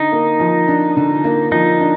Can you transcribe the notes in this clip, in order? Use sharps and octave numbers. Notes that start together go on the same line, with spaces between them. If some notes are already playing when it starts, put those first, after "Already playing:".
Already playing: D3 D#4
A#3
F3
D4
D3
A#3
F3 D#4
D4